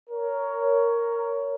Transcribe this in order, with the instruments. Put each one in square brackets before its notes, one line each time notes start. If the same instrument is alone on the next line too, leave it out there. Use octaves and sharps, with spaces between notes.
[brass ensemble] A#4 C#5